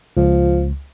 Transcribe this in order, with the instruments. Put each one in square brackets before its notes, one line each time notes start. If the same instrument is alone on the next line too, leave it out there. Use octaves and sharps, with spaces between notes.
[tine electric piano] C#2 [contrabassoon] F3